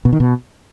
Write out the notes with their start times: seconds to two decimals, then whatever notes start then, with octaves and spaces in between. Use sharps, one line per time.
0.05 B2
0.13 D#3
0.20 B2